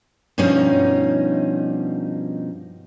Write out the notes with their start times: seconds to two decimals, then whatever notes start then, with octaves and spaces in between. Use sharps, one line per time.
0.38 G2 B2 F3 C#4 D#4